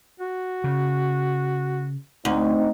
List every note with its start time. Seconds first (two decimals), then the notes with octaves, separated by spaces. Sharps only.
0.20 F#4
0.64 C#3
2.25 D2 C4 D#4